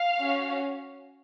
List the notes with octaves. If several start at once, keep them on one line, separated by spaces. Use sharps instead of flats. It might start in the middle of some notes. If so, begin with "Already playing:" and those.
Already playing: F5
C#4 F#4